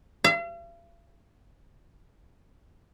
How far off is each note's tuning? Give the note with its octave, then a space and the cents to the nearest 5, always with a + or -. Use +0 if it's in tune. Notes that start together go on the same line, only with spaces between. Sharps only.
F5 -45